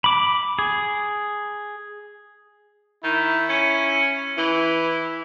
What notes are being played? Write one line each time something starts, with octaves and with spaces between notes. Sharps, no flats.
B5 D6
G#4
D#3 E4
C#4
E3 E4